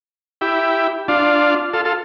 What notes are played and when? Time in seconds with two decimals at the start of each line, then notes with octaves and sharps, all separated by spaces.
0.41 E4 G4
1.08 D4 F4
1.73 F4 A4
1.85 F4 A4